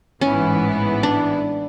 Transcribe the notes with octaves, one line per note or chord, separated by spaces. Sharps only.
A1 G#2 E3 B3 C#4 E4
D4